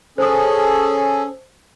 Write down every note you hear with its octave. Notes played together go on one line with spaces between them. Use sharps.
C#4 G#4 A4 C5 D#6